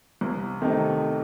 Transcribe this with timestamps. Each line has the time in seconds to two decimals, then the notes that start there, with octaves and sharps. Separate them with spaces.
0.21 C2
0.61 C3 D#3 A3 D#4